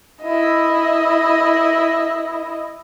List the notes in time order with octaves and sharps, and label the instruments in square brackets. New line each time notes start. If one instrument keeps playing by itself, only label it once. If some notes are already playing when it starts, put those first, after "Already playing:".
[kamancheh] E4 D#5